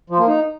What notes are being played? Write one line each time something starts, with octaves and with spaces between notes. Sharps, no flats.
F3
A#3
D#4